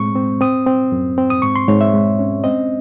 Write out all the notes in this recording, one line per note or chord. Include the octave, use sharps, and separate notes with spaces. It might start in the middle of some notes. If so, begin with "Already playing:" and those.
Already playing: A2 G#3 C4 C#6
C4
C4 D#6
C4
F#2
C4
D#6
G#2 C#6
C6
G#2 C#5
E5
G#3
C#4
C4 D#5